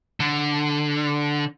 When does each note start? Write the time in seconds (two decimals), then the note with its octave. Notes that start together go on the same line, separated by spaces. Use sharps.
0.20 D3